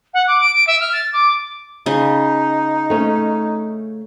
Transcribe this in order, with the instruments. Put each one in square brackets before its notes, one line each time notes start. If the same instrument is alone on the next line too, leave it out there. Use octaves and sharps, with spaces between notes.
[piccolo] F#5
D6
D7
D7
E5
F6
A6
D6
[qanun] C#3 [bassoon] D#4
[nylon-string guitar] A3 C#4